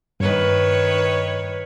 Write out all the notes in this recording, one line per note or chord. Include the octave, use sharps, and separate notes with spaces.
G2 D#3 B4 C#5